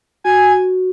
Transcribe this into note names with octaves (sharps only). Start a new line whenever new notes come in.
F#4 G#5